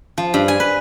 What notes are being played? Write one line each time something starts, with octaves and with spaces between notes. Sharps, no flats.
F3
G2
G#5
B4